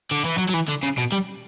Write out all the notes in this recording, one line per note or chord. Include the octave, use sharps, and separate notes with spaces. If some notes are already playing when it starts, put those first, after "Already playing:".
D3
E3
F#3
F#3
E3
D3
C#3
B2
G3